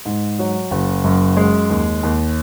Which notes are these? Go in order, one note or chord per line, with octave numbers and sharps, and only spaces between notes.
G#2
F#3
F#1
F#2
G#3
D#2
D#2